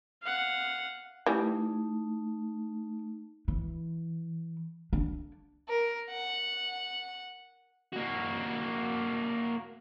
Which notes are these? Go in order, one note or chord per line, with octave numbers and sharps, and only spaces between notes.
F5 F#5
E3 G3 A3 D#4
E3
D4
A#4
F#5
A#3 F#4